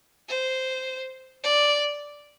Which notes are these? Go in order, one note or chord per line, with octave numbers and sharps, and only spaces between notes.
C5
D5